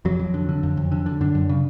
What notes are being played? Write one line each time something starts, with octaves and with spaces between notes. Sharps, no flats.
F2 F#3
F2
D3
D3
F2
F2
D3
D3
F#2 D4
F#2
C#3